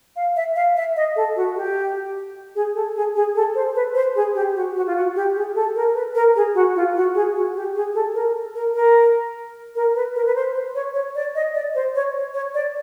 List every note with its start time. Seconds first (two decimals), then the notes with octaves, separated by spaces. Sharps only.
0.16 F5
0.36 E5
0.56 F5
0.76 E5
0.96 D#5
1.16 A4
1.36 F#4
1.56 G4
2.55 G#4
2.75 A4
2.96 G#4
3.16 G#4
3.36 A4
3.55 C5
3.75 B4
3.95 C5
4.15 G#4
4.35 G4
4.55 F#4
4.76 F#4
4.87 F4
4.96 F#4
5.16 G4
5.35 G#4
5.55 A4
5.76 A#4
5.95 B4
6.15 A#4
6.36 G#4
6.55 F#4
6.76 F4
6.96 F#4
7.15 G#4
7.35 F#4
7.55 G4
7.75 G#4
7.95 A4
8.15 A#4
8.55 A#4
8.75 A#4
9.75 A#4
9.95 B4
10.15 A#4
10.26 B4
10.35 C5
10.55 C5
10.75 C#5
10.94 C#5
11.15 D5
11.35 D#5
11.54 D5
11.75 C5
11.95 C#5
12.34 C#5
12.54 D5